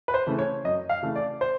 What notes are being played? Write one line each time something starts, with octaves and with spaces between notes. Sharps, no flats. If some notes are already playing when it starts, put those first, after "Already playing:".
B4
C5
C#3 E3 A3
C#5
F#2 D#5
F5
C#3 E3 A3
D5
C5